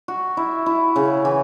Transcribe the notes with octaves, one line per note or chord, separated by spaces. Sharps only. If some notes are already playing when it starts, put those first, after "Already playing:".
F#4
E4
E4
C#3
E3